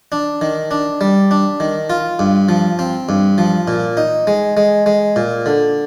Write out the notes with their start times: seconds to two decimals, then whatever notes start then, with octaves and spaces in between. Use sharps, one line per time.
0.12 D4
0.41 D#3
0.71 D4
1.01 G3
1.31 D4
1.60 D#3
1.90 F4
2.19 G2
2.49 F3
2.79 C4
3.09 G2
3.38 F3
3.68 A#2
3.97 D#4
4.27 G#3
4.57 G#3
4.86 G#3
5.16 A#2
5.46 D3